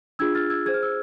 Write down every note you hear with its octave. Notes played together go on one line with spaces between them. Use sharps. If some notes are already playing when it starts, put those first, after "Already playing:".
D4 F4 G#4 E6 G#6
F6 A6
E6 G#6
G#4 C5 G#6
F6
E6